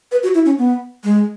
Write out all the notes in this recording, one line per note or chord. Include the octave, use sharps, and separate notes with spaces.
B4
F#4
E4
C#4
B3
G#3